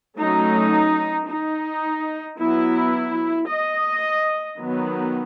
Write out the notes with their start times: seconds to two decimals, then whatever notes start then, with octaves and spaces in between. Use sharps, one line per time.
0.17 F#3 A3 C#4 D#4
1.27 D#4
2.38 F#3 B3 E4
3.48 D#5
4.58 D#3 F#3 B3